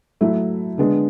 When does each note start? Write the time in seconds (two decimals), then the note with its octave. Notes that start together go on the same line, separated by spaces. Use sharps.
0.21 F#3 A3 E4
0.78 D3 G#3 B3 D4